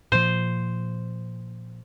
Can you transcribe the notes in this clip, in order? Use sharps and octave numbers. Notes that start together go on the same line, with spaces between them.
A#2 F3 C5